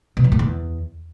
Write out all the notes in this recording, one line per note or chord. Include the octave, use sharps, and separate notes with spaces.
B2
F#3
A#2
E2